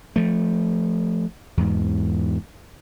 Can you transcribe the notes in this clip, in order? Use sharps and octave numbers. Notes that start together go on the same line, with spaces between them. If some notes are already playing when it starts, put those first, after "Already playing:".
F3 A3
E2 G#2